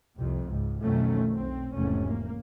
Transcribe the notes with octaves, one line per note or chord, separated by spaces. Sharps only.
C2 F2 C3
C#2 G#2
B1 F2 D#3 F#3 A3 C#4
B1 C4
F1 E2 G#2 C3 A3 C#4
A#3